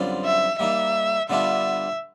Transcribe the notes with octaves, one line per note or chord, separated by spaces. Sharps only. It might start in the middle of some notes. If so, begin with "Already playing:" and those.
Already playing: F#2 D3 G3 C4 F4
E5
G3 A#3 D#4 E5
D3 G3 B3 D4 F4 E5